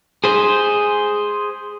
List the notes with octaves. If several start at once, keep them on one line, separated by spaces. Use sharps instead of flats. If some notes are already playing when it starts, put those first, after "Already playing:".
G#4 C5